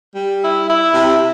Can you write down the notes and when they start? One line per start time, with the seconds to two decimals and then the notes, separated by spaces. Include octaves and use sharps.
0.15 G3
0.42 E4
0.68 E4
0.94 C3